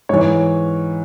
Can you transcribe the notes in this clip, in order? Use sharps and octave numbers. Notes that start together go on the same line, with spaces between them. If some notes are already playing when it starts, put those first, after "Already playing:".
G#2 E3 C#5